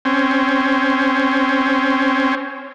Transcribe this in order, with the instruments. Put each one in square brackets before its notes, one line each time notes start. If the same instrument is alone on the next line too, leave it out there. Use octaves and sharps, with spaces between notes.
[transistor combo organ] C4 C#4